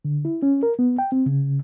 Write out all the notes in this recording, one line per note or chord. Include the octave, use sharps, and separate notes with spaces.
D3
E4
C#4
A#4
B3
G5
C4
C#3